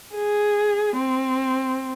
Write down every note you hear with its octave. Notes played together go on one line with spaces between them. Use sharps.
G#4
C4